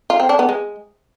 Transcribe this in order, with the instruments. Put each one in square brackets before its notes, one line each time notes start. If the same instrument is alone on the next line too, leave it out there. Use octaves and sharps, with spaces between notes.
[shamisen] F4
C4
D4
B3
G#3